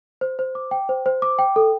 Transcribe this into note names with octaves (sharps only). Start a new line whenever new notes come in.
C5
C5
D6
G5
C5
C5
D6
G5
A4